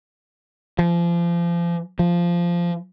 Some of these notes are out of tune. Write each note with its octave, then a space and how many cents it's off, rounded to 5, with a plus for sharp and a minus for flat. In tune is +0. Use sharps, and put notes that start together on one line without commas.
F3 -30
F3 -10